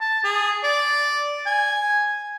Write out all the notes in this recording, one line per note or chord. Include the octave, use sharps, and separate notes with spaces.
A5
G#4
D5
G#5